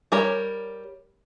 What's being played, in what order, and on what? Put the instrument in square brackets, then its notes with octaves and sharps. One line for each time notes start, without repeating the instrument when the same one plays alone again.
[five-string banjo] G3 A#4 C#5